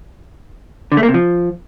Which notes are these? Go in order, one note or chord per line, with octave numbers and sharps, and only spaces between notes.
D3
A3
A#3
C3
F3